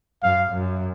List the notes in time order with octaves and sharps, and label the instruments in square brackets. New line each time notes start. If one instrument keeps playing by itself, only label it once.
[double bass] F#2 [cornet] F5
[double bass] F#2